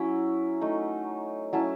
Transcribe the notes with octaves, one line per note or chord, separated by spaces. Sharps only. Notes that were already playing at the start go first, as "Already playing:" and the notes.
Already playing: F#3 C#4 E4
A3 D#4
F#3 C#4 E4 A5